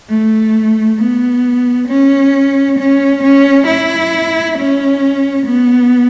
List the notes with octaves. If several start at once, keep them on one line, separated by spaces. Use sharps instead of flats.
A3
B3
C#4
C#4
C#4
E4
C#4
B3